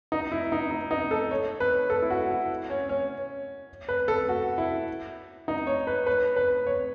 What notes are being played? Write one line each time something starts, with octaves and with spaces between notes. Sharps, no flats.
D#4
E4
D#4
D#4
D#4
A4
C#5
B4
A4
E4
F#4
E4
C#4
C#4
B4
A4
F#4
E4
D#4
C#5
B4
B4
B4
C#5